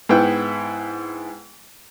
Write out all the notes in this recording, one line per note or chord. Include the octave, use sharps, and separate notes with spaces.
G#2 B3 E4 B4 G5